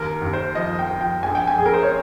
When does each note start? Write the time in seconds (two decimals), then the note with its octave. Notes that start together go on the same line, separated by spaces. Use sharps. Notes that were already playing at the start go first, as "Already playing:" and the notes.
Already playing: D#2 A#4
0.22 D#2
0.33 C5
0.55 F3 D#5
0.79 G5
0.89 F3
1.01 G5
1.23 A#1 G#5
1.35 G5
1.47 G#5
1.56 A#1 G#4
1.66 A#4
1.74 C5
1.83 C#5